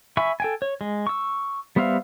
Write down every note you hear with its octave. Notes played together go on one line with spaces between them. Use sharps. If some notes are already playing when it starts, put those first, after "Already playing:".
E5 G#5 B5 C#6
A4 G5 G#5
C#5
G#3
C#6 E6
G3 B3 C5 E5 F5